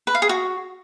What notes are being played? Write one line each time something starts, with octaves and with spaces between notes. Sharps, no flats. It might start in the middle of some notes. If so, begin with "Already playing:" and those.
B4
F5
G#4
F#4